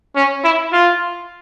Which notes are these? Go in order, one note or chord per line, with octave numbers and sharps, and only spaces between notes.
C#4
E4
F4